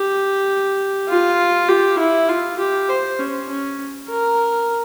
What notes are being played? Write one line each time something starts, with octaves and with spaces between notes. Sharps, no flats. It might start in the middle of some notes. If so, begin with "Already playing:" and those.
Already playing: G4
F4
G4
E4
F4
G4
C5
C#4
C#4
A#4